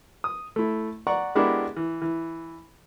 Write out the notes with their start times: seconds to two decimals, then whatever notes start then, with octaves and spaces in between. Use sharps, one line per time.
0.24 D#6
0.56 A3 E4
1.07 D5 F#5 A#5 C#6
1.35 G#3 B3 D4 E4 G4 A#4
1.76 E3
2.02 E3